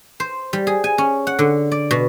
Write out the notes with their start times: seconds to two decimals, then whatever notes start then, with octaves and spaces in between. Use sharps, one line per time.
0.20 C5
0.53 G3
0.67 G#4
0.84 G#5
0.98 C#4
1.27 F#5
1.39 D3
1.72 D5
1.91 B2